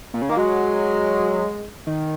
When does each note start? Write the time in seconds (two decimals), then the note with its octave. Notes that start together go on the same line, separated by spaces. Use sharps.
0.14 A#2
0.22 C#3
0.29 D#3 A#3
0.37 F#3 G#3
1.87 D#3